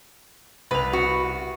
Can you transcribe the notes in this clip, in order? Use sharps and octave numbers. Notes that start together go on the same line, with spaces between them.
C2 B4 F7
F#4